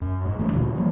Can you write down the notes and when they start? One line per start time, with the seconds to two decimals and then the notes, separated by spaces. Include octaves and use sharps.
0.01 F#2
0.25 G#2
0.39 G2 E3 A3
0.53 D2 A#2 D3 D4
0.75 E3 F3 G3 A#3